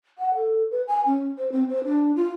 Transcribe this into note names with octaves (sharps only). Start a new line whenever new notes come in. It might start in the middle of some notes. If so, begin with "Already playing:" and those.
F#5
A4
B4
G#5
C#4
C5
C4
C5
D4
F4